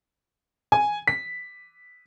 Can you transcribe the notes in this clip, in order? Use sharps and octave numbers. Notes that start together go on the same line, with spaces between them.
G#5
B6